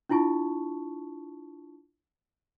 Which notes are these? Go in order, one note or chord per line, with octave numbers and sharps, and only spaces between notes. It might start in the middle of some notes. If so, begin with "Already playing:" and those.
D4 E4 F4 A5 C#6